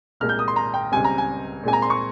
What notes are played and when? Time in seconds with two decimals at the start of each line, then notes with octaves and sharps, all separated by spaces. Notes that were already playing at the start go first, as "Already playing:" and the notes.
0.20 C2 A#2 G#3 F6
0.29 G6
0.39 D#6
0.48 C6
0.56 A#5
0.74 G5
0.92 C#2 C#3 G3 C4 G#5
1.04 A#5
1.18 G#5
1.63 A#2 G#3 C4 G#5
1.73 A#5
1.82 C6
1.90 C#6